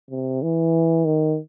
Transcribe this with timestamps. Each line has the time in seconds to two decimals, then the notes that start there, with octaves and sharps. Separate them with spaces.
0.11 C3
0.42 E3
1.05 D#3